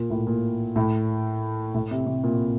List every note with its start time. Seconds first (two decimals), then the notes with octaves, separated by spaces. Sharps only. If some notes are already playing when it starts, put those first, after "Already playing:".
Already playing: A#2
0.10 A2
0.27 A#2
0.76 A2
1.74 A2
1.91 C3
2.06 C3
2.24 A#2